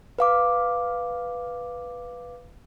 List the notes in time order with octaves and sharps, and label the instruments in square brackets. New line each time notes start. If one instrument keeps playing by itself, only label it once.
[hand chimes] B4 F5 D6